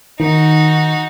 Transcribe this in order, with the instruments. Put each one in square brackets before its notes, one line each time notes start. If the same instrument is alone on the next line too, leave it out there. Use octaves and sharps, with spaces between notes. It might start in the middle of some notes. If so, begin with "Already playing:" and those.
[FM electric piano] D#3 [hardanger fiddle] D#4 F#4